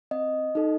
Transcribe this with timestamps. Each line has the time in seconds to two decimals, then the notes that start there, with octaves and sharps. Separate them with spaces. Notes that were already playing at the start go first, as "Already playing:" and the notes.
0.11 C4 D#5
0.55 D#4 A4